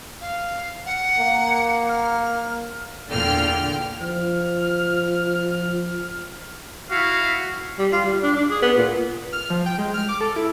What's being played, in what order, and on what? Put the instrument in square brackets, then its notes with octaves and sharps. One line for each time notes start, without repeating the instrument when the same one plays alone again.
[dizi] F5
F#5
[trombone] A#3
[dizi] F6
[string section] E2 A#2 D3 G5 F6
[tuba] F3 [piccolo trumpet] F6
[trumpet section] E4 F#4 F5
[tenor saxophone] G3
F4
G3
D4
D4
G#4
B3
A#2
[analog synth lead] F6
F3
G5
G#3
F6
D6
A4
E4